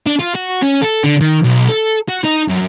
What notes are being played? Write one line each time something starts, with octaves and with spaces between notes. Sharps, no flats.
D4
F4
F#4
C#4
A4
D3
D#3
B1
A4
F#4
D#4
F#2